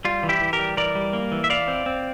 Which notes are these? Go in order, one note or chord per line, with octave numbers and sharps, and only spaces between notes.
G3 F4
E3
E4 G4
E3
G4 A#4
G3
E3 A#4 D5
G3
A#3
E3
E5
E4 D5 F5
C4
C4